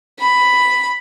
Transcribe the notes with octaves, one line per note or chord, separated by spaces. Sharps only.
B5